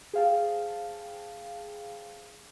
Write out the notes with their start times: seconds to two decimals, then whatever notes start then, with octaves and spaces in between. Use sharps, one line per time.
0.13 G#4 C5 F5 G5 A5